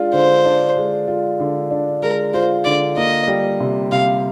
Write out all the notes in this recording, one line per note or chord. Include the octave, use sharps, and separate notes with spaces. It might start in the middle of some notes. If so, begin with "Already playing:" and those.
Already playing: G#3 D4 F4
D3 C5
D4
G#3
F4
D3
D4
G#3 A#4
F4 C5
D3 D5
A#3 D#5
G3
C3
C3 F5